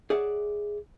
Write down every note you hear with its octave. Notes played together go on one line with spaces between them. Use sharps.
G#4 C#5 D5 E5 F#5